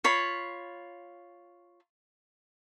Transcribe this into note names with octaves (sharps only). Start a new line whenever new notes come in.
F4 C#5 B5